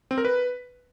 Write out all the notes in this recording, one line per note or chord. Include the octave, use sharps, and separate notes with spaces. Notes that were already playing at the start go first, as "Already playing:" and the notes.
C4
A#4
B4